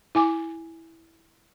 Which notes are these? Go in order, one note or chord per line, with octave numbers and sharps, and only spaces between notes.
E4 G#5 D6